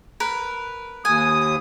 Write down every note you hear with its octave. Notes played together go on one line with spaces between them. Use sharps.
A#4 B4
D#2 G#5 D#6